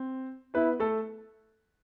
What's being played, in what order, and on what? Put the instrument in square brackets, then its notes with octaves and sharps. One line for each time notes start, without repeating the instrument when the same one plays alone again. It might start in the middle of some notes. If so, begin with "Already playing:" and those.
Already playing: [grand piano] C4
[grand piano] B3 B4 [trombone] E4
[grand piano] A3 A4